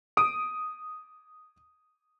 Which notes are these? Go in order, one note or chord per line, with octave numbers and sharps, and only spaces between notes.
D#6 D7